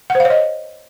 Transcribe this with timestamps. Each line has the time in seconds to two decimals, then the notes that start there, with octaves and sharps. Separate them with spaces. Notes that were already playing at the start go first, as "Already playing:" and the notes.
0.10 F#5
0.15 C5
0.20 F5
0.25 C#5
0.30 D#5